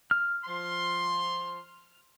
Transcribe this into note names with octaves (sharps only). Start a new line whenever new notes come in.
F6
F3 C6